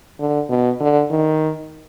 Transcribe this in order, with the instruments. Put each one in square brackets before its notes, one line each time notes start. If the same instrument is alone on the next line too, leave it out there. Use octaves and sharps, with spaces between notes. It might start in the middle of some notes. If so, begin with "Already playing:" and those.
[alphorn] D3
B2
D3
D#3